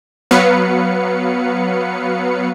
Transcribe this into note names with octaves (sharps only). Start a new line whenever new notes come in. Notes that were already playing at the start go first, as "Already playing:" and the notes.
F#3 B3 B4 F5 C#7